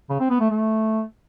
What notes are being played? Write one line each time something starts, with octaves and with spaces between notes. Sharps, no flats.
C#3
C4
B3
A3
A3